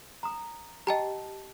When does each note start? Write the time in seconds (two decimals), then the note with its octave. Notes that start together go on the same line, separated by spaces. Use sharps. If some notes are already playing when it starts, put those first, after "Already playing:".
0.23 A#5 D#6
0.87 G4 D#5 G5 A5 A#5